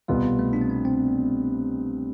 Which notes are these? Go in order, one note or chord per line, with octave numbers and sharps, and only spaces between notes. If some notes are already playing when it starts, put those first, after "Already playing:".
C2 B2 G3 B3 F4
A3
D4
C4
B3
C4